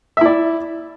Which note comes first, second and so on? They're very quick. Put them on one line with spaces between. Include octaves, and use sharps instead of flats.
E5 E4 D5